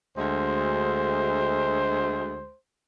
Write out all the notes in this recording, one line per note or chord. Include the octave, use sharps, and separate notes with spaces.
D2 G#3 C5